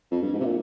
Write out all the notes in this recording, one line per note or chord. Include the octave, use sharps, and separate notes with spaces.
F2
G2
G#2
C3
A#2